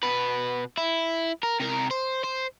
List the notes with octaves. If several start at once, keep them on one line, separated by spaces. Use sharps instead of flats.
B2 B4
E4
A#4
C3 A#4
C5
C5